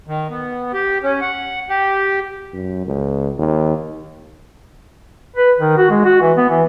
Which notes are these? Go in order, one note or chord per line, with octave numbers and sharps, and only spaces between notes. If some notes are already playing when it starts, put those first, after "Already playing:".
D#3
B3
G4
C#4
F#5
G4
F#2
C#2
D#2
B4
D#3
F#4
G#3
F#4
E3
B3
E3